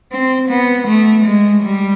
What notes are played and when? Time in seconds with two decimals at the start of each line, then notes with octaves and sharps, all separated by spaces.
0.12 C4
0.49 B3
0.88 A3
1.26 G#3
1.63 G3